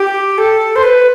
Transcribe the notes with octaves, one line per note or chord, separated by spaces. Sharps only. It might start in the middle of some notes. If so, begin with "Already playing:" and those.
Already playing: G4
A4
C5
B4